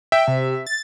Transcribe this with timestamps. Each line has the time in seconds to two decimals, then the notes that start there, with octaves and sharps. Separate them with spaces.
0.12 E5 G5
0.28 C3
0.67 A6